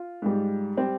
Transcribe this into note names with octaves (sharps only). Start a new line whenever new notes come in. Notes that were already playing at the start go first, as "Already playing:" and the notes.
Already playing: F4
G#2 G3
G3 C4